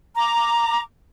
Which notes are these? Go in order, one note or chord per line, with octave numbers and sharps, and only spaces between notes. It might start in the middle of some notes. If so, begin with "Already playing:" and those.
A#5 D6